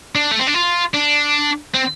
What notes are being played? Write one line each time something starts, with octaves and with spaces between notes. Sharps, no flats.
D4
A3
C4
D4
F4
D4
C4